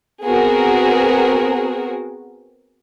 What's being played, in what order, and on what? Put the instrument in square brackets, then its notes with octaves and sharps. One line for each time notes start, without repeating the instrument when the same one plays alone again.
[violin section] B3 C4 F#4 G#4 A#4